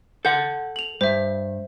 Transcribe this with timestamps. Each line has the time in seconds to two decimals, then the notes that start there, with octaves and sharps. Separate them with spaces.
0.25 A4 F#5 G6
0.76 F7 F#7
1.01 G2 C5 E5